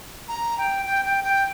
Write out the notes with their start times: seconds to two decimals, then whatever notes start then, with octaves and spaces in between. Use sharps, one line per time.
0.28 A#5
0.58 G5
0.86 G5
1.05 G5
1.24 G5